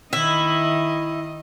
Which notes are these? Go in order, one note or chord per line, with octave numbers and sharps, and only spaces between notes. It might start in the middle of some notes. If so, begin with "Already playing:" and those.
D#3 E4 D#5